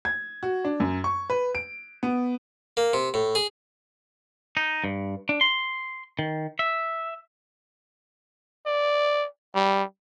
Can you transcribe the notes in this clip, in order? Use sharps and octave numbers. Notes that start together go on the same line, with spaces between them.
G#6
F#4
D4
F#2
C#6
B4
D7
B3
A#3
C3
A2
G#4
D#4
G2
D4
C6
D#3
E5
D5
G3